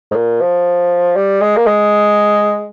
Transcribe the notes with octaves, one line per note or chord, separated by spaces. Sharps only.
G#2
A#2
F3
G3
G#3
A#3
G#3